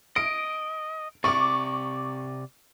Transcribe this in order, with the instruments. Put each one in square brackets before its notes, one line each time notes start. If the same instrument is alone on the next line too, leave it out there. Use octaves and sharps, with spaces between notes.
[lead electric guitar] D#5 [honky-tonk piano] D7
[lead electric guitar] C3 D5 [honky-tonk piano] C#6 D6